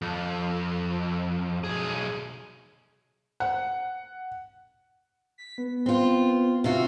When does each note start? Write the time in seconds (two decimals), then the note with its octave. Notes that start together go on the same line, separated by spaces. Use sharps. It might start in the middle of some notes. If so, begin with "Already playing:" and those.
0.02 F2
1.64 B1 G#4
3.40 F#5
5.38 B6
5.58 B3
5.86 C4 F4
6.64 C3 F4 F#4 E5